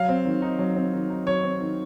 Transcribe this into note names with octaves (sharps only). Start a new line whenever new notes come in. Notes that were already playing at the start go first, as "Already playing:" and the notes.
Already playing: F#3 F5
C4
D#3
D#4
F#3
C4
D#3
D#4
F#3 C#5
C4
D#3